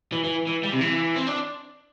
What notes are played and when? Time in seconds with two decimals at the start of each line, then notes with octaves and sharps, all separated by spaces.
0.12 E3
0.24 E3
0.47 E3
0.63 G3
0.72 C3
0.81 E3
1.16 C4
1.26 D4